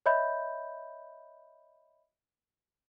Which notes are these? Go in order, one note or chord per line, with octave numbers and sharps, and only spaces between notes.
C#5 D#5 E5 B5 G6